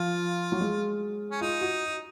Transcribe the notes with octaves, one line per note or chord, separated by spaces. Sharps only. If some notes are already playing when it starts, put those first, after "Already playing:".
Already playing: F3 F4
F#3
G#3
C#4
D#4 F4
F#4